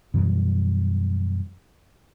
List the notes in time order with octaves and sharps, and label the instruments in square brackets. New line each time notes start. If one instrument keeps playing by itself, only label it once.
[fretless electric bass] F#2 B2 E3 G3